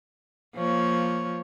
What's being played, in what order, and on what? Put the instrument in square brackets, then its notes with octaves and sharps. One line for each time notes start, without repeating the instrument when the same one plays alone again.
[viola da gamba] F3 A#3 C#5